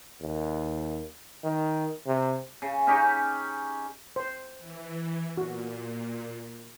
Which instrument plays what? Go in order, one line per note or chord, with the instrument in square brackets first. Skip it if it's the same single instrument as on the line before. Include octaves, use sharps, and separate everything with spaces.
[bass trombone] D#2
D#3
C3
[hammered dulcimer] C#3
C#4 D#4 G4
[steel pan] C5
[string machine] E3
[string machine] A#2 [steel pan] F#4